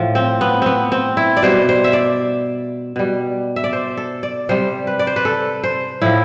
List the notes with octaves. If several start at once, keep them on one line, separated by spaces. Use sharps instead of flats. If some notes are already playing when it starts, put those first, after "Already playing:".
Already playing: A2 F3
C4
B3
B3 C4
C4
E4
D5
B2 G3 C5
C5
E5
D5
B2 G3
E5
D5
C5
A4
D5
C3 G3 C5
B4
D5
C5
B4
A4
C5
A2 F3 E4